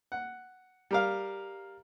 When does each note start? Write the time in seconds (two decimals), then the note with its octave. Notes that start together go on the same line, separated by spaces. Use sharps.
0.12 F#5
0.91 G3 A#4 F5